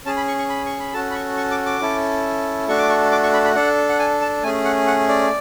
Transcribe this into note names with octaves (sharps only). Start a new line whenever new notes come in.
C#4 G#4 A5
B5
C#6
C#6
B5
C#6
B5
C#4 F#4 A4 A5
B5
C#6
C#6
D6
D6
C#4 E4 A4
A3 D4 F#4 A4 C#6
D6
C#6
D6
C#6
B5
B5
D4 A4 F#5
F#5
G#5
A5
A3 C#4 G#4 G#5
F#5
F#5
D5